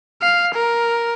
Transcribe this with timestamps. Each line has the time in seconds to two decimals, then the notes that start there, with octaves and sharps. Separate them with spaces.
0.22 F5
0.55 A#4